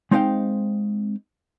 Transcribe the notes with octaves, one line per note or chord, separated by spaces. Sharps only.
G#3 C4 D#4 C5 F5 G5